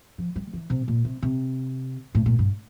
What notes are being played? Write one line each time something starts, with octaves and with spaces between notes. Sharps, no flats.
F3
G3
E3
C3
A#2
C3
C3
A2
A#2
G2